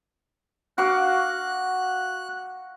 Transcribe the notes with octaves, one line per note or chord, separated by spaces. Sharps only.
F#4 F5 D6 F#6